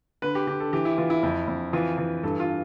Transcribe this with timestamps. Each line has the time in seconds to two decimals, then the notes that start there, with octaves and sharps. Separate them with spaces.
0.22 D3 B4
0.35 G4
0.47 D3 G4
0.60 A4
0.73 E3 G4
0.85 E4
0.98 E3 F4
1.10 E4
1.23 F2
1.48 F2
1.73 E3 F4
1.98 E3
2.23 G2 A4
2.40 F4